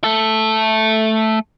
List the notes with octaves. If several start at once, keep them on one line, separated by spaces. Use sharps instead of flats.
A3 A4